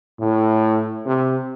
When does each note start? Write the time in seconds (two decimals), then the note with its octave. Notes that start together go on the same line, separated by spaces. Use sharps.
0.19 A2
1.06 C3